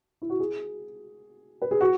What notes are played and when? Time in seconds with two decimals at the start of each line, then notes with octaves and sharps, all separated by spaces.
0.22 E4
0.30 F#4
0.40 G#4
1.62 B4
1.71 G#4
1.81 F#4